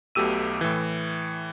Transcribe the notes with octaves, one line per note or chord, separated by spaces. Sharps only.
B1 B2 A3 G4 E6 D#7
A2 E3